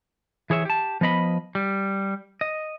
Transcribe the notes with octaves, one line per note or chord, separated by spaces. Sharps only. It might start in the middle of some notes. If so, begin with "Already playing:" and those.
E3 G#4 C#5 E5
G4 A5
F3 B3 D#5 B5
G3
D#5